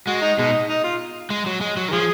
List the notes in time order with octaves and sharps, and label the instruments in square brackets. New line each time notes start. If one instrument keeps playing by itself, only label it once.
[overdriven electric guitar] G#3 [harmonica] F#4
[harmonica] D#4
[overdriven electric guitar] B2 [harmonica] G#3 D#4
[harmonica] D#4
F4
[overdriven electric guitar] G#3
F#3
G#3
F#3
D#3
[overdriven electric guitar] F3 [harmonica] F4 G#4